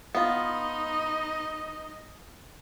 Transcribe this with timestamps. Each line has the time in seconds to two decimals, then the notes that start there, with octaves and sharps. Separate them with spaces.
0.15 B3 D#4 F4 D#5